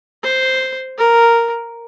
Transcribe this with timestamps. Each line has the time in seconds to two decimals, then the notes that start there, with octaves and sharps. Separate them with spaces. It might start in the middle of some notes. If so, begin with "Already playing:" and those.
0.23 C5
0.98 A#4